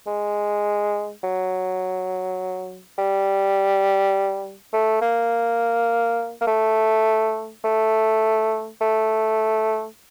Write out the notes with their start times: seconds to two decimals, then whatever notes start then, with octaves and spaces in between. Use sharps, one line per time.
0.07 G#3
1.24 F#3
2.98 G3
4.73 A3
5.02 A#3
6.41 A#3
6.47 A3
7.64 A3
8.81 A3